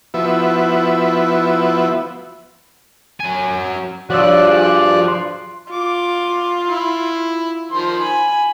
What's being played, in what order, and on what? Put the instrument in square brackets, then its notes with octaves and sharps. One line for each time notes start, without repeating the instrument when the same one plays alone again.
[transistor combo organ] F3 B3 E4 F#4 B4 E5
[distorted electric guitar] F#3 G#5
[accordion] G2 D5 F#6 [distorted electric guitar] F3 [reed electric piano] F#4 C#5 E6
[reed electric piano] F#4 G#4
C6
[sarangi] F4 [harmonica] D6
[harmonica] E4
D#3 F3 C6
[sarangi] G#5 [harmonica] B5